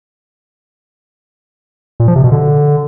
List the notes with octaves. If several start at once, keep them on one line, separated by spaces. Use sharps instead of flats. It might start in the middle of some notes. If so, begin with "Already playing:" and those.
A#2
F3
C3
B2
D3